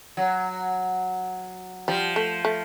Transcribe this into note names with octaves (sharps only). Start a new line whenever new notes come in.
F#3
F3 G3
A3
A3